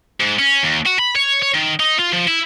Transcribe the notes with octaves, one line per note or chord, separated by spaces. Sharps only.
G#2
C#4
D#2
F#4
B5
C#5
C#5
D#3
D#4
F4
F3
E4